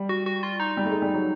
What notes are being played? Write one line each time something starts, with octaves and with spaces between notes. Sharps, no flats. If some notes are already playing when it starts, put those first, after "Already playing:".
Already playing: G3
F#4
F#4
F4
D#4
G3
A3
G#3
G3
F#3